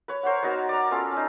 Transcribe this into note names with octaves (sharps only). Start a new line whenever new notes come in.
B4 C#5
A#4 C5 C#5 F#5
B3 D#4 F#4 A#4
D5 A#5
B3 C#4 F4 A4
C#4 D#4